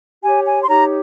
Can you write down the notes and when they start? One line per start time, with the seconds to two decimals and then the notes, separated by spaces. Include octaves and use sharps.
0.23 G4 C#5 G#5
0.46 G#5
0.61 C6
0.67 D#4 G4 C#5 A#5